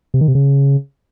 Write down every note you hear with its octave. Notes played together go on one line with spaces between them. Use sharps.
C3
D#3
C3
C#3